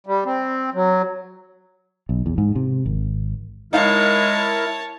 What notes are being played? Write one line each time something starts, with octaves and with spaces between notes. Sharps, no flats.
G3
C4
F#3
B1
E2
G#2
C3
G#1
G#3 D#4 E4 A#4 C#5 F5 A5